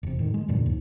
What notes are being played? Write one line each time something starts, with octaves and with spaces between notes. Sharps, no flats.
E1 C3
A2 D#3
G#3
E2 G2 A#2 D3
D#2 G#2